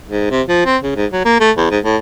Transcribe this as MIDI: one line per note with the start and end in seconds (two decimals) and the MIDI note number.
0.09 0.28 44
0.31 0.42 48
0.48 0.65 53
0.66 0.77 60
0.83 0.96 49
0.96 1.06 44
1.12 1.24 54
1.25 1.38 58
1.40 1.52 57
1.57 1.68 40
1.71 1.79 44
1.84 1.97 45